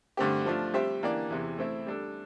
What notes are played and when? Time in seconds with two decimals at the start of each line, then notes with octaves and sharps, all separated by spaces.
0.17 G2 D3 A3 C4 G4
0.46 F3 A3 D4 F4
0.74 G3 C4 G4 C5 E5
1.03 E3 A#3 D4 G4 D5
1.30 E2 C3 E3
1.58 A3 C4 E4
1.87 G3 D4 A4